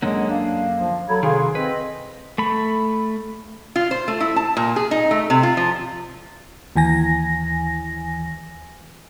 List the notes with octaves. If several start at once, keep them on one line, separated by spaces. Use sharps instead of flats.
F#2 D3 G#3 A#3 C#5 F#5
D4 F5
F3
F#3 A4 B5 G#6
C3 D#3 F#4 G#4 F5 C6
C4 B4 D#5
A3 B5
F4
C5
A3
E4
A5
A#2
G#4
D#4
A3
C3
F4
F3
D#2 E3 G#5 A#6